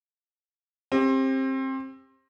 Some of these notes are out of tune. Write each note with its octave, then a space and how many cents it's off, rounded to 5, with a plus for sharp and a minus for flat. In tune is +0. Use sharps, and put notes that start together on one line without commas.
C4 +25 G4 +25